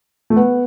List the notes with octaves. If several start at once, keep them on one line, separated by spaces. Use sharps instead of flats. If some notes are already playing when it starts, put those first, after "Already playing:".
A3
B3